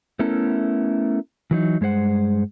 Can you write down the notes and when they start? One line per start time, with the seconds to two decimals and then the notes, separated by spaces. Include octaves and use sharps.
0.19 A3 B3 C#4 E4 A4 A#4
1.51 E3 F#3 D#4
1.81 G2 G#3 G#4 C5 F#5